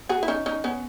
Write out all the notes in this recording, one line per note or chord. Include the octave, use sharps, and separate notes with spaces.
F#4 G#4
E4
C#4 D#4
C#4 D#4
B3 C#4